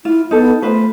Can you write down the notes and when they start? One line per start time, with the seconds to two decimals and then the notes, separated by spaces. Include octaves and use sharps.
0.05 E4 F4
0.31 B3 D#4 A4
0.62 A3 F4 B4 C5